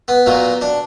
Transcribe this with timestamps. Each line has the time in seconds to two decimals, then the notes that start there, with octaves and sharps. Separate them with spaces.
0.08 B3
0.26 A#2 F#3 A#3
0.61 D4